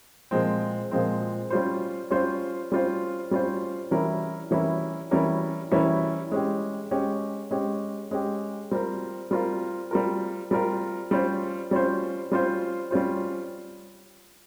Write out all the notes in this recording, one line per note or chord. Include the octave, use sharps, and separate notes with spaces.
A#2 F3 G#3 C4
A#2 F3 G#3 C4
G3 C#4 F4 C5
G3 C#4 F4 C5
G3 C#4 F4 C5
G3 C#4 F4 C5
E3 G3 C#4 E4 A#4
E3 G3 C#4 E4 A#4
E3 G3 C#4 E4 A#4
E3 G3 C#4 E4 A#4
G#3 C#4 G4
G#3 C#4 G4
G#3 C#4 G4
G#3 C#4 G4
G3 C4 F4 A#4
G3 C4 F4 A#4
G3 C4 F4 A#4
G3 C4 F4 A#4
G3 C#4 F4 C5
G3 C#4 F4 C5
G3 C#4 F4 C5
G3 C#4 F4 C5